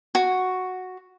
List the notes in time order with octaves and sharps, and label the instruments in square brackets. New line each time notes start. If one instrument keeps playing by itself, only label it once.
[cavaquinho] F#4